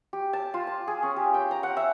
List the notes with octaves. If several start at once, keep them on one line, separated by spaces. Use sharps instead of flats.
G4
A5
F4
A5
G#4
C#4
G4
G5
A#5
F#5
E5